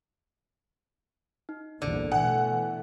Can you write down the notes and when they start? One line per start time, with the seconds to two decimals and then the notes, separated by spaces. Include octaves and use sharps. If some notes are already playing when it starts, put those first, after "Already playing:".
1.49 D#4
1.82 A#1 E2 G2 D3 D5
2.12 B2 E3 A3 F#5 G#5